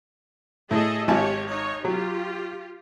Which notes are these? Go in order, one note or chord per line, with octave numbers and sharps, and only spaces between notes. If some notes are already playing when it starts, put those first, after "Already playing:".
A2 G#4 A4 D#5
G#1 G4 C#5 G#5 A5
D#4 C#5
F#3 F4 G4